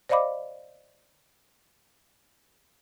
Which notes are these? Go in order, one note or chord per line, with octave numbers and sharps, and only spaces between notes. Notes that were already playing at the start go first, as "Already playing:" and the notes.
C5 D5 D#5 F5 B5 D6